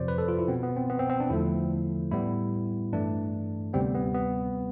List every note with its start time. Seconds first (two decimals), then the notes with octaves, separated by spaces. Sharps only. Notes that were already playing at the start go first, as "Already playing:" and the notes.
Already playing: F2 C3 F3 C5 D5
0.08 B4
0.18 A4
0.28 F4
0.38 E4
0.48 B2 B3 C4
0.63 B3
0.76 C4
0.89 B3
0.99 C4
1.09 C4
1.20 D4
1.30 E2 D3 F3 A3 E4
2.12 A2 G3 B3 E4
2.92 G2 E3 A3 D4
3.73 D2 C3 G3 B3 C4
3.94 B3
4.14 B3